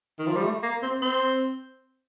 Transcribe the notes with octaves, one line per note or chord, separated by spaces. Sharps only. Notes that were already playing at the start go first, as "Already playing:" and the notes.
D#3
F3
G3
A3
A#3
C4
C4